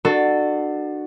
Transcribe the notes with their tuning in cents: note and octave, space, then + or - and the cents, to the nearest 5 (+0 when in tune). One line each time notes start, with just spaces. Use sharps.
D4 +35 F#4 +0 A4 +0